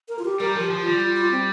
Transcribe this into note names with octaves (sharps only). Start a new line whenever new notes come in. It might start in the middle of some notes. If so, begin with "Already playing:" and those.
A#4
F4
G4
G3 A#4
F3
G4
F3
G3 F4
F4
F4
C4